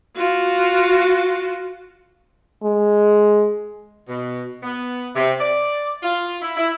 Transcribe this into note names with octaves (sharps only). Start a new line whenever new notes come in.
F4 F#4
G#3
B2
B3
C3
D5
F4
E4
E4